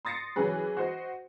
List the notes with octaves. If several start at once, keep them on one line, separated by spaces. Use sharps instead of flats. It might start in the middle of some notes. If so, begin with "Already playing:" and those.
C6 D#6 A6 A#6 C7 C#7
E3 F#3 C#4 G#4 B4
F#4 C5 D#5